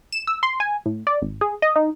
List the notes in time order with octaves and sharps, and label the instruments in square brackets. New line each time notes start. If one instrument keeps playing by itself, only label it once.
[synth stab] E7
E6
C6
G#5
A2
D5
G#1
G#4
D#5
D#4